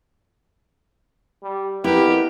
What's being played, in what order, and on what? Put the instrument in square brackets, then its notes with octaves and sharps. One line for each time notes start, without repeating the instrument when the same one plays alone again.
[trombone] G3
[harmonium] F2 A#4 B4 [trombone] B3 [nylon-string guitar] E4 [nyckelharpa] G4